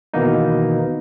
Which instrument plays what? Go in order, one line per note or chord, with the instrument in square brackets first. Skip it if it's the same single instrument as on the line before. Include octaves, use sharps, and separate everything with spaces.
[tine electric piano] B2 D#3 E3 A#3 B3 D#4